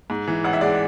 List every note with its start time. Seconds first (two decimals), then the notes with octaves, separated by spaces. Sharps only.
0.10 G#2
0.27 E3
0.44 A1 F#5
0.53 E5
0.61 G#3 D5 F#5